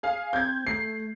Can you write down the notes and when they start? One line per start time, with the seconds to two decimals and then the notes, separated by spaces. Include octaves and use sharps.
0.03 G#4 F5
0.33 C4 G6 G#6
0.67 A3 C7